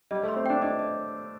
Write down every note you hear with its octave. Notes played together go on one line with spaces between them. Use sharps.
G3 D#5
A3
C6
C4
D4 G5
D4 D#5
D#5